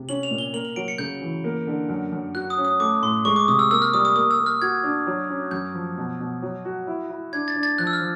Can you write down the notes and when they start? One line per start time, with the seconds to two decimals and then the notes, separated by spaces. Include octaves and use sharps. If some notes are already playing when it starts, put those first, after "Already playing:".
Already playing: C3
0.09 C#4 F#7
0.23 F7
0.31 A#2
0.38 G7
0.53 A#3 F#7
0.65 F#7
0.76 F#3 D7
0.88 C#7
0.98 C#3 G6
1.22 E3
1.44 A#3
1.67 D3
1.89 F#2
2.12 F#2
2.35 F#4 F#6
2.50 D#6
2.58 C#4
2.65 D#6
2.79 A3 D6
3.02 A2 C6
3.25 G#3 C#6
3.36 D6
3.48 C3 D#6
3.59 E6
3.71 A#3 E6
3.82 F6
3.94 G3 D#6
4.05 D#6
4.16 A#3 D#6
4.31 E6
4.39 A#3
4.46 F6
4.62 F#4 G#6
4.83 D4
5.07 F#3
5.29 C#4
5.51 F#2 G6
5.74 F3
5.98 B2
6.20 B2
6.42 F#3
6.65 F#4
6.87 E4
7.10 E4
7.33 D4 G#6
7.48 A6
7.55 D4
7.63 A6
7.78 F3 F#6
7.87 E6
7.93 F6
8.01 F3